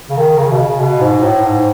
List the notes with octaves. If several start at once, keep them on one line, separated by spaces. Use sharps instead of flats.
C#3
D#3
C#3
B2
C#3
B2
G#2
A2
G#2